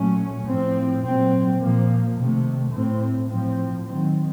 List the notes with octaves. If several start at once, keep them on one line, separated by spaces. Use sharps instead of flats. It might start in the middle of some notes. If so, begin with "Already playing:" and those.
Already playing: A#2 F#3 A3 C#4
A2 F3 C4
A#2 F#3 C4
A#2 F3 A#3
C3 D#3 A3
A2 A3 C4
A2 F3 C4
D#3 F#3 C4